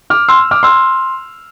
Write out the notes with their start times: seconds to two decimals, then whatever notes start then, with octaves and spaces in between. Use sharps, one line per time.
0.10 D6 F6
0.28 C6 E6
0.51 D6 F6
0.63 C6 E6